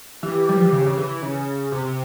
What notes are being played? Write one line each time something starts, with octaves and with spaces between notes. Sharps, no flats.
E3 G4
G3
F3
E3
C#3
C#3
E3
C#3
C3